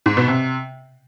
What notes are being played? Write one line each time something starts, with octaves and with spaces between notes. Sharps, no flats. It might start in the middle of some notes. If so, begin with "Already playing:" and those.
G#2
B2
C3